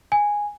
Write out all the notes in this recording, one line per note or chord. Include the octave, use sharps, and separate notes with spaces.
G#5